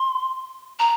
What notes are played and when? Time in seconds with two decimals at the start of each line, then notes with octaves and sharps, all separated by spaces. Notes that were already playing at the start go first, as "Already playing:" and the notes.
Already playing: C6
0.79 A#5